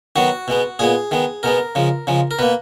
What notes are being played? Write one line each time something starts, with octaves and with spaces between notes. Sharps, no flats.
D#3 F#3 B3 F#4
B2 G#3 B3
A#2 G#3 B3 G#4
D#3 G#3 B3
B2 G#3 B3 A#4
C#3 F3 G#3
C#3 F3 G#3
A#4
B2 A#3 B4